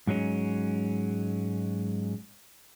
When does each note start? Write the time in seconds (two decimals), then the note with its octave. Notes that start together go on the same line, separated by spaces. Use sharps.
0.07 G#2 F#3 G#3 C#4